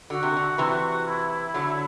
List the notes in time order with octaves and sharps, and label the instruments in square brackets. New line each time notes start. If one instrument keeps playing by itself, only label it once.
[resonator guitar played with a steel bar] D3 [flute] F#4
[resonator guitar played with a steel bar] C3
D3
C3 E3
[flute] E4
[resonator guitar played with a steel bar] D3 F#3